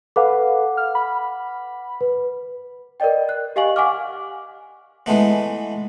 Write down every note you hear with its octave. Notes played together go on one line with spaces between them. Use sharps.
A4 B4 F5 F#5 D6
F6
B5
B4
A#4 B4 D5 D#5 G5
F#6
G4 D#5 F5 G#5 C#6 F#7
F5 F#5 G#5 C#6 D6 F6
E3 G#3 A3 B3